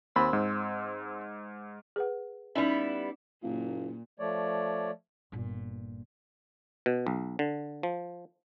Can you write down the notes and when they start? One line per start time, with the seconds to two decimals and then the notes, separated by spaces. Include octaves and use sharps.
0.16 D#2 C4 B5
0.33 G#2
1.96 G#4 B4 F#5
2.55 G3 B3 C#4 D#4 E4
3.43 F#1 A#2 F4
4.19 F3 A3 C#5 D5
5.32 G1 A#2
6.86 B2
7.07 B1
7.39 D3
7.83 F3